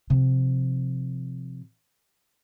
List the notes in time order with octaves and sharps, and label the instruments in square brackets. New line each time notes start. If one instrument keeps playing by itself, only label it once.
[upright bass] C3 F3